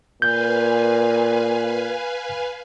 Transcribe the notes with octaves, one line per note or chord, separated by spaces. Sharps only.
A#2 B4 F5 G#5 G6